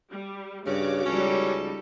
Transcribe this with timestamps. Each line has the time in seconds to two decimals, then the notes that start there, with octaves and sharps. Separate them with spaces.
0.12 G3
0.66 G2 C#3 F#4 C#5 D6
1.06 C#2 G3 C#4 D#4 A4